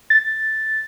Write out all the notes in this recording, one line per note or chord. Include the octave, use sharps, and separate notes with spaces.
A6